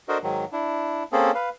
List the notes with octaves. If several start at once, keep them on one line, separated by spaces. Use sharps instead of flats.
D4 F#4 A4 A#4 C5 D#5
G#2 D#3 F#3
D4 E4
A#3 C4 C#4 G#4 A4
B4 F5